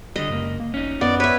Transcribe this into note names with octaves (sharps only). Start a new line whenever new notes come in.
D3 G3 D#5
C#2 F#2 A#3
A#3
G#1 C#4 D#4
F#2 B3 D5
B4 C#5 E5